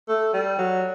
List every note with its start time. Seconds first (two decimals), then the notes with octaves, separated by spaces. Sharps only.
0.08 A3
0.34 G3
0.59 F#3